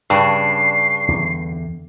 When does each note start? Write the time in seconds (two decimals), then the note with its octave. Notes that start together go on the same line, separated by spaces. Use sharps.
0.10 G2 C#3 D4 C7
1.08 E2 D3